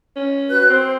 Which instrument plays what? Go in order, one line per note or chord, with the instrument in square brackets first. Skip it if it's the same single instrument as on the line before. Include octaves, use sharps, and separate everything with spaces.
[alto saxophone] C#4
[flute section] F#4 B4 F#6
[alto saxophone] C4 [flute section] C5